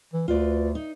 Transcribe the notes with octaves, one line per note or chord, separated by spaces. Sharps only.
E3
D2 F4 B4 D5
D#4